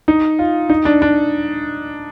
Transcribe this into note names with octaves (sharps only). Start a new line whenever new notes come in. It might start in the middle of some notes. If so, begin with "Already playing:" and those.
D#4
F4
D#4
D4
D4